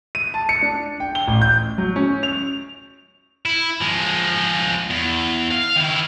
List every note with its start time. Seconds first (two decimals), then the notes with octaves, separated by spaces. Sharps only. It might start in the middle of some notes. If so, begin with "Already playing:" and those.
0.15 D#7
0.34 A5
0.49 C#7
0.62 D4
1.00 G5
1.15 G7
1.28 A1
1.42 G6
1.78 F#3
1.96 C#4
2.23 F7
3.46 E4
3.82 F3 G#3
4.90 E2
5.51 F5
5.76 D#3 E4